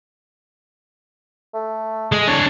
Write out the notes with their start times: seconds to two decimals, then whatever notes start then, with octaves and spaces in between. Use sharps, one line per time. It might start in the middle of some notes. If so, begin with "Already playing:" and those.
1.54 A3
2.12 G#3 G#4
2.28 D4 C#5